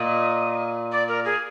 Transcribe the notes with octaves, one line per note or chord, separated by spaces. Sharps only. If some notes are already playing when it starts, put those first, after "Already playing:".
Already playing: A#2 D#5
D5
A#4
G#4